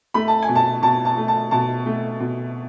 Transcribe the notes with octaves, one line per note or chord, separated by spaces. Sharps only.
A3 B5
A5
G#5
B2
A5
B2 A5
A5
A3
A5
B2 A5
A3
B2